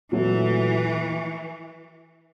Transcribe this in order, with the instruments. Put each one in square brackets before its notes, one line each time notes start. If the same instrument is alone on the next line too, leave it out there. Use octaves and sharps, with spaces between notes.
[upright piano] A#2 F#3 A3 [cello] E3